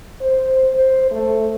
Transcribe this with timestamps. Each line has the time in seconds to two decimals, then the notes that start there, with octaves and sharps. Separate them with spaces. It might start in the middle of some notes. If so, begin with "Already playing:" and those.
0.21 C5
0.75 C5
1.12 A3